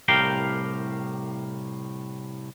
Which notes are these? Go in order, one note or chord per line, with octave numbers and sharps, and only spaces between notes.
C2 A2 G4 A#4 F5 G5